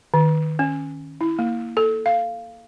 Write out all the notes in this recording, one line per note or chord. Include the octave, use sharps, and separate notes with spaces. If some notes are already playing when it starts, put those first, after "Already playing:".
D#3
C#4
E4
A#3
A4
F5